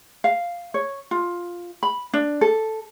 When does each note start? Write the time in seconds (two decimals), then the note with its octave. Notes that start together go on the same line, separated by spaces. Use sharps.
0.24 F5
0.74 C#5
1.11 F4
1.83 B5
2.14 D4
2.41 A4